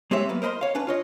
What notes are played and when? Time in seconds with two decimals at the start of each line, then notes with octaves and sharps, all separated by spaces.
0.11 G#3 C4 G4 C#5 E5
0.29 F#3 A#3 B3 B4
0.42 A#4 C5 D#5 B5 C6
0.61 C#5 F5
0.75 C#4 D4 B4
0.87 F4 C#5 D#5